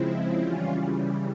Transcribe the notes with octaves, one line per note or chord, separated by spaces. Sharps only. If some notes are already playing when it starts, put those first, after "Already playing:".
Already playing: C#3 F3 G#3 C4 E4
C#3 E3 G3 C#4 F4